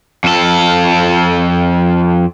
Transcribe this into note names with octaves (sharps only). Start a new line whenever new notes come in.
F2 A4